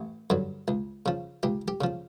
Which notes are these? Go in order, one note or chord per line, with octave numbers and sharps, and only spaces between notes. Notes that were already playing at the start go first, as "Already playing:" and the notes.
Already playing: A1
G2 D3 F#3
C#2
C#3 F3
C#2 G4
G4
C#3 F3